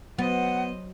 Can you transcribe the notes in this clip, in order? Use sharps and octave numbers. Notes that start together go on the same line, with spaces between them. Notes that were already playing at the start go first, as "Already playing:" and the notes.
F#3 B3 C5 D#5 F#5